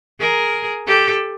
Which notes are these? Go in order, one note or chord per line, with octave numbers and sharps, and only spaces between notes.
G#4 A#4
G4 A4